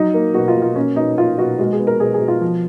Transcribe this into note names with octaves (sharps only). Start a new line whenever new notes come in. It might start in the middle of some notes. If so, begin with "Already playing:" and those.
Already playing: F#3 D#4
A#3
B2 F#4
F4
B2
F4
A#3 C#4
B2 D#4
A#3 F4
B2 F#4
G#3 F#4
G#4
B3
A#4
B2 G#4
G#4
B2
F4
F3